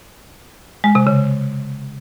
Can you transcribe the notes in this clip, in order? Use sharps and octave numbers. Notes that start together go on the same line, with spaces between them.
G#3
C3
C#3